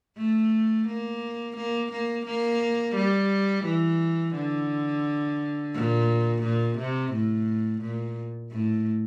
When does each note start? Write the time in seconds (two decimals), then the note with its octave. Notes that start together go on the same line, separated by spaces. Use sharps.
0.17 A3
0.88 A#3
1.57 A#3
1.92 A#3
2.26 A#3
2.96 G3
3.65 E3
4.35 D3
5.74 A#2
6.42 A#2
6.78 C3
7.13 A2
7.81 A#2
8.51 A2